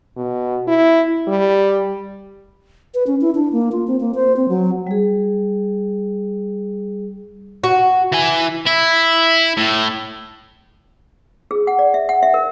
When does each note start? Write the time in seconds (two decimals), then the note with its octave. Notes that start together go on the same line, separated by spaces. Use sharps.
0.16 B2
0.67 E4
1.28 G3
2.94 B4
3.07 C#4
3.21 E4
3.35 D4
3.52 A#3
3.72 F4
3.87 C4
4.00 A#3
4.15 C5
4.36 C4
4.49 F#3
4.87 G3 G#4
7.64 F#4
8.12 E3 G#5
8.66 E4
9.57 A2
11.51 G#4
11.67 F#5
11.79 D5
11.94 E5
12.09 F#5
12.23 E5
12.34 A#4